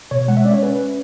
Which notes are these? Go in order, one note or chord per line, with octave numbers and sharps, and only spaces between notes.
B2 C#5
G#3 F#5
E5
C#4 D5
C#5
C#4 B4